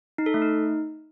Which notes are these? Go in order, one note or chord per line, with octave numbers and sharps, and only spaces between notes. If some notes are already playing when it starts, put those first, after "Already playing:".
D#4
A4
A3
D#4